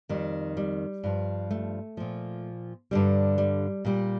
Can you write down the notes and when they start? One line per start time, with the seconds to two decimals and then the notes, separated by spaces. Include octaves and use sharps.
0.09 F2 D#3 G3
0.57 G3
1.04 G2 F3
1.51 A3
1.97 A#2 F3
2.91 G2 D3 G3
3.38 G3
3.85 A#2 G3